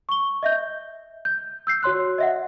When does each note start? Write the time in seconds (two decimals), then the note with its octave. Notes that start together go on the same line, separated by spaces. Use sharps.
0.09 C#6 G7
0.43 D#5 E5 G6
1.25 G6
1.67 E6 G6 C7
1.83 F#4 C#5 C6 F#6
2.18 D#5 E5 F#5